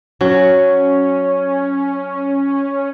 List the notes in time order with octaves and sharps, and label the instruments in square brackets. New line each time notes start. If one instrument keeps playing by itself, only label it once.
[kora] F#3 [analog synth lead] C#4 [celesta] C#5